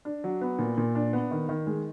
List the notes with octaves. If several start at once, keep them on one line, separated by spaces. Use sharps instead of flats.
D4
F#3
B3
A#2
A#2
D4
B3
D#3
D#3
G#3